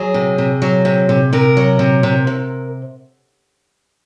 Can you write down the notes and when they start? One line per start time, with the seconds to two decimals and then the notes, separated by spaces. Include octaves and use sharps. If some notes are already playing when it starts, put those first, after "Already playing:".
Already playing: F#3 G#4
0.14 C3
0.38 C3
0.62 F#3
0.85 C3
1.09 C3
1.33 C3 A#4
1.57 F#3
1.79 C3
2.03 C3
2.27 C3